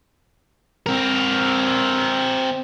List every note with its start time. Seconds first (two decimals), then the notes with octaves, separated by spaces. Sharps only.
0.86 C4 A#4